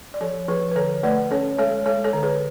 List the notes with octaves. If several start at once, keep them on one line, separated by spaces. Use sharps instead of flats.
D5
F3 A4 C#5
F3 G#4 B4
B4
D3 A4 C#5
A3 B4 D5
C#4 A4 C#5
G#3 A4 C#5
G#3 A4 C#5
A4 C#5
D3
G#4 B4